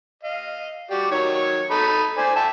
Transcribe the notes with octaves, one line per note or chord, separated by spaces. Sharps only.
D#5 F5
F#4 G4 D5
D#3 F#3 C#5
D#4 A4 B5
C5 D5 G#5
E5 G5 A5